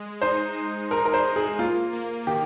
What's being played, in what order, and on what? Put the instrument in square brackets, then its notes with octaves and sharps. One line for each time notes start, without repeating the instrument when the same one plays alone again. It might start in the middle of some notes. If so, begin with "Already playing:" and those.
Already playing: [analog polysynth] G#3
[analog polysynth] D#4 [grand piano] C5
[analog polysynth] D#4
[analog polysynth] D#4 [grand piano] A#4
[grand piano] A#4
C5
[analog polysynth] G#3
[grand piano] G#4
[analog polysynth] A#3 [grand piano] F4
[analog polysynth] A#3
[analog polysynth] D#3 [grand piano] G4